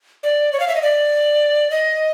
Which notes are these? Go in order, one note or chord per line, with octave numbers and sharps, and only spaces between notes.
D5
C#5
F5
E5
D#5
D5
D#5